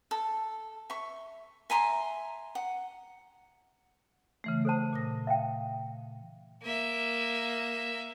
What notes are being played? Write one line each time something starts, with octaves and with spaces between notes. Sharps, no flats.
A4
E5 C#6
E5 G#5 A#5 C6
F#5
C#3 E3 A3
A4 C5 A5
A#2 D#6 A#6
E5 F5 G5
A#3 E5